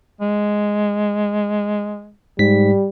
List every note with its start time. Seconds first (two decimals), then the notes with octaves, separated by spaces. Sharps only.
0.21 G#3
2.39 G#2 G3 B6